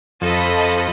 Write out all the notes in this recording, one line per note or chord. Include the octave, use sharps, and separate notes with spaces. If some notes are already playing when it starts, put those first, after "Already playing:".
F2 A4 D#5 B5